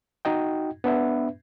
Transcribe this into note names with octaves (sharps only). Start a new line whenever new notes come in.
D#4 F#4 D#5 G5
B3 D4 B4 E5